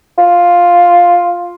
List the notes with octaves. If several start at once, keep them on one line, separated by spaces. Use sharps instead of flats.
F4